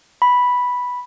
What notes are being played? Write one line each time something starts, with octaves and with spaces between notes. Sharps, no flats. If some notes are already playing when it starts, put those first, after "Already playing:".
B5